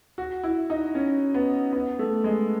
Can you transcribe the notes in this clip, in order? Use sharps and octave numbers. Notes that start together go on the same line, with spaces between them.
F#4
E4
D#4
C#4
B3
B3
A3
G#3